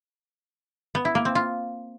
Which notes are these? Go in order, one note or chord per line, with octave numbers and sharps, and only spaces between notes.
B3
E4
A#3
C4
F4